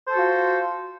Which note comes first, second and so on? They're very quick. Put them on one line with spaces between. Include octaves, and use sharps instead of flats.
C5 A4 F#4 F4